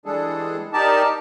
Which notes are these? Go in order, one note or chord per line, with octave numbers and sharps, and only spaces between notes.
E3 G3 G#3 D4 G#4 A4
D#4 G4 A#4 D5 A5